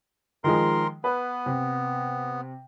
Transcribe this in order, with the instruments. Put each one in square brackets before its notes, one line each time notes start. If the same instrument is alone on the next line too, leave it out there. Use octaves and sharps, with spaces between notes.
[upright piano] D#3 F3 G#3 [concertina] A#4 C6
[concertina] B3 [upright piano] B4
[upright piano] C3